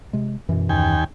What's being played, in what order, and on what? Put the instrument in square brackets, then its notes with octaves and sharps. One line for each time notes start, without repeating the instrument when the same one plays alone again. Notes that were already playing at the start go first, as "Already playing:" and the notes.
[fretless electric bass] C3 G#3
[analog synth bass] F#2 [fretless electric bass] B2 E3
[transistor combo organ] D#2 G5 G#5